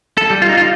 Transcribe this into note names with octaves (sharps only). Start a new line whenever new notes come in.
A4
G3
F4
D#4
F4